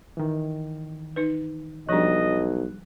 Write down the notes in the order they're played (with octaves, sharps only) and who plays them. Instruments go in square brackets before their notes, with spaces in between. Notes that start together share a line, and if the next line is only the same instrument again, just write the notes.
[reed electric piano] D#3 E3
[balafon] D#4 B4
[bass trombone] B1 [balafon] F3 D4 [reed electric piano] G3 F#6 [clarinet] D#5